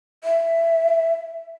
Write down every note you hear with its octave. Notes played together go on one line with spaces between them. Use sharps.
E5